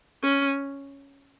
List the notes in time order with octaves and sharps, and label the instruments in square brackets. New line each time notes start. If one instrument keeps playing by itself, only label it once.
[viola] C#4